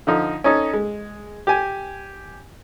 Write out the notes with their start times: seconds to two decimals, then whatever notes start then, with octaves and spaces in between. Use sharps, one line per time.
0.07 D3 F3 D#4
0.44 C#4 D#4 A4
0.73 G#3
1.47 G4 G#5